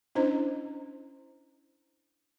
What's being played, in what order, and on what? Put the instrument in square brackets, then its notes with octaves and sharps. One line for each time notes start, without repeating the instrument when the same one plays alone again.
[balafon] C#4 D4 E4 C5 D#5